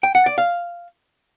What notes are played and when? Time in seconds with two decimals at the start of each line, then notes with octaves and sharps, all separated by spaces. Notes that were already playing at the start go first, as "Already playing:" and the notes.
0.03 G5
0.15 F#5
0.26 D5
0.38 F5